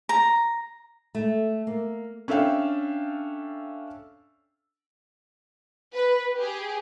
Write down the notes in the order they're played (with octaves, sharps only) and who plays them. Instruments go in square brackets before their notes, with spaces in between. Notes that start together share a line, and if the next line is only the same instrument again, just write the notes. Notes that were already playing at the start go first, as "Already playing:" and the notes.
[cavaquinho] A#5
[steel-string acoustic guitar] A3
A#3
[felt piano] C#4 D4 A4 E5 F5 G5
[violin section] B4
G4 G#4